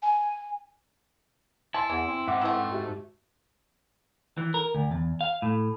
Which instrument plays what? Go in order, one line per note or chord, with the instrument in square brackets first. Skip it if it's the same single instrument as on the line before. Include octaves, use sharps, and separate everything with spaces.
[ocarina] G#5
[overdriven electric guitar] E4 [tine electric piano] G#5 C6 [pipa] A5
[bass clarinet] E2 [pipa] E3
[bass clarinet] C4
[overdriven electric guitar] G#2 [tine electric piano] E5 F#5 D6
[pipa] A3 B3 E4
[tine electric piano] F#4 G4 E5
[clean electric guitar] E3
A#4
D2
E2
F5
A2